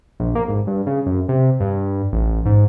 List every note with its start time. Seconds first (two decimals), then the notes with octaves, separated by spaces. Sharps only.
0.20 A#1
0.35 A#3
0.48 G#1
0.67 G2
0.86 C#3
1.06 F#2
1.28 C3
1.60 G2
2.12 A1
2.45 G#2